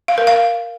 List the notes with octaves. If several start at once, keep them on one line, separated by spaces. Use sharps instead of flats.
F5
A#4
F5